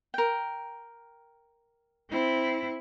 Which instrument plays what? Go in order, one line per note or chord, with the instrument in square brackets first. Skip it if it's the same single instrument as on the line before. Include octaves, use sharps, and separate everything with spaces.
[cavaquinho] A#4 G5
[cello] C4 E4